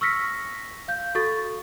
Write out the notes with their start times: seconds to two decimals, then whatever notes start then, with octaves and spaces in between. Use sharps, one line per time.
0.01 C#6 E6 F6 A#6 B6 C#7
0.88 F5 G6
1.15 F#4 A4 C#6 A6